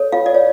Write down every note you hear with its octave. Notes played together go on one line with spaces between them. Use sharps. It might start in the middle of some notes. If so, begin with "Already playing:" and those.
Already playing: A4 C#5
F4 F5
D5
C#5